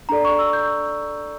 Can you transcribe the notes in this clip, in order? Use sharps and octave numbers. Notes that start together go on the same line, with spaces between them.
D4 A4 D5 A#5
C#6
E6
G6